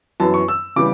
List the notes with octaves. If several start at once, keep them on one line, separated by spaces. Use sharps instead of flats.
F#2 E3 B3 A5
C#6
E6
C#3 E3 G3 B3 D6